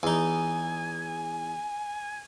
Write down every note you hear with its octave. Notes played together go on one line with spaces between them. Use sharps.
E2 D#4 G#5